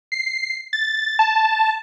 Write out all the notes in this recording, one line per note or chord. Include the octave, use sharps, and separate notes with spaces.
C7
A6
A5